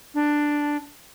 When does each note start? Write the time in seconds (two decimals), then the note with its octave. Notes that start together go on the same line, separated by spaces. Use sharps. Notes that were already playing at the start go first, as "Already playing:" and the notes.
0.14 D4